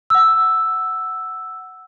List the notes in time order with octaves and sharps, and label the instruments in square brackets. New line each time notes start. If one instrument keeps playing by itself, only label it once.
[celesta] F#5 E6